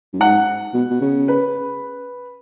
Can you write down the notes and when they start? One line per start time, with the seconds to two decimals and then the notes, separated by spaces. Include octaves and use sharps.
0.13 F#2
0.20 G#2 F#5
0.74 B2
0.90 B2
1.01 C#3
1.28 B4